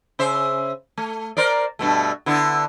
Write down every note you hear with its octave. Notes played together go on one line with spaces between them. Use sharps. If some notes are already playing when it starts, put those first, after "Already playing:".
C#3 C5 E5
A3
A#4 C5 D5
G2 B2 A3
D3 B3 E4